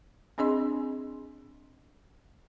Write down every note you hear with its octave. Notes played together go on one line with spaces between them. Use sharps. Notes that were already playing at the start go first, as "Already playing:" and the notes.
C4 D4 G#4 D#5 C6